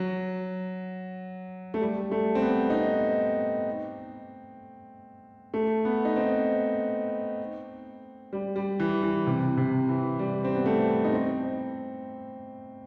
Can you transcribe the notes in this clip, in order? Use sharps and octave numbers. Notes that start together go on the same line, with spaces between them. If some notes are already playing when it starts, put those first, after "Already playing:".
Already playing: F#3
A3
G3
A3
C4
B3
D#4
C4
A3
B3
D#4
C4
G3
G3
E3
E3
C3
C3
E3
G3
C4
B3
A3
D#4
C4